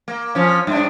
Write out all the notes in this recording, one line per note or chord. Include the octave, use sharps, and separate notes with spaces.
A#3
F3 C#4
G2 D4